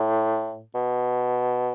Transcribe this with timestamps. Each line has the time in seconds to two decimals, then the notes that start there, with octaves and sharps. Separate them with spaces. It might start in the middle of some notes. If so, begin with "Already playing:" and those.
Already playing: A2
0.75 B2